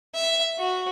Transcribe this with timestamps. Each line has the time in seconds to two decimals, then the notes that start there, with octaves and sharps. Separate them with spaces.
0.15 E5
0.59 F#4